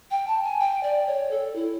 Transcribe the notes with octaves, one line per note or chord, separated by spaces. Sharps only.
G5
A5
G#5
G5
D5
C#5
A4
E4